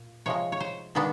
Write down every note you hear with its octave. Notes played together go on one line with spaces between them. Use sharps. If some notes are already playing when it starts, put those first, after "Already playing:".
Already playing: A#2
C3 F3 G#3 C#5
C#5
C5
D#3 G#3 B3 D4